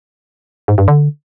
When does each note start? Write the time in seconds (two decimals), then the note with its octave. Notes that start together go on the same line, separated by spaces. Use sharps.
0.68 G#2
0.78 G2
0.88 D3